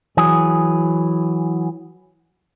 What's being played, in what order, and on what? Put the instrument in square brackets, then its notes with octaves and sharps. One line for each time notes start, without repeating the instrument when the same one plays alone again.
[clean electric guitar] E3 F#3 G#4